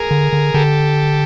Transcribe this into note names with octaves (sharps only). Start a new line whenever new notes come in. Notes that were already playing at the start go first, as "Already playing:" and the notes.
Already playing: G#4 A#4
D3
D3
D3 G4 A4